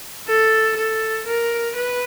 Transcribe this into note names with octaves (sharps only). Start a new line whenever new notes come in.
A4
A4
A#4
B4